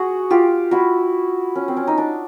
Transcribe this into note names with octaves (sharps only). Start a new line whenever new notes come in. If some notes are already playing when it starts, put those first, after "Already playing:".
Already playing: F#4 G#4
F4 G4
E4 F#4
C#4
C4
C#4
D#4
D4